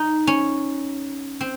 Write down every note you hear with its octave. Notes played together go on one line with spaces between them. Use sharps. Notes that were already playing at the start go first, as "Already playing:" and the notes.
Already playing: D#4
C#4
C4